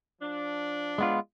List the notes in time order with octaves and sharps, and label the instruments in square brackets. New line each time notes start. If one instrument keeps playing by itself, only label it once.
[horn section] F3 D4
[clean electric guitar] G#3 B3 F4